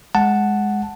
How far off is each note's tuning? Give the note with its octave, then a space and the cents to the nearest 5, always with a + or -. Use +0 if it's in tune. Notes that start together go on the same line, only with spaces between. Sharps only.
G#3 +0 F#5 +0 A5 +0